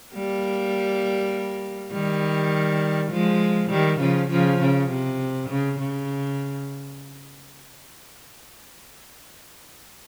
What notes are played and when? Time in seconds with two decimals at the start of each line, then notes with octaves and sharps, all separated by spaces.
0.14 G3 A#3
1.92 D#3 G3
3.11 F3 G#3
3.70 D#3 G3
4.00 C#3 F3
4.30 C#3 F3
4.61 C#3
4.90 C3
5.50 C#3
5.79 C#3